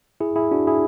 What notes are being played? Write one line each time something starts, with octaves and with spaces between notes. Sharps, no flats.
E4 G#4
E4 G#4
D4 F#4
E4 G#4